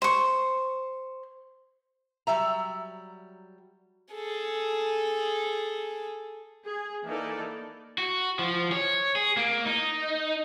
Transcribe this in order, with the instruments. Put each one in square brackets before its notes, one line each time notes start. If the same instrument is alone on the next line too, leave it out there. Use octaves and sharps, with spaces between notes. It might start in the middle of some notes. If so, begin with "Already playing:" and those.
[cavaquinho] C5 C#6
[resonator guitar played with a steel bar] F#3 G3 E5 A#5
[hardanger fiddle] G#4 A4
[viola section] G#4
E3 A#3 D#4 A4 A#4 D5
[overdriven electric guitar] F#4
F3
C#5
G#4
A#3
D#4